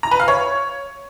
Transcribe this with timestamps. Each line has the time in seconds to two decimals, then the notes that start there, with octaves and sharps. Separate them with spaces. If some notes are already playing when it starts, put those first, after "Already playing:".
0.03 A#5
0.11 B4
0.20 F5
0.28 C#5